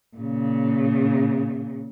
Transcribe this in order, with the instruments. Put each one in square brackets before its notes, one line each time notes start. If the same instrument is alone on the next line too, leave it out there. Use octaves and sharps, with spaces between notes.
[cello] A#2 C#3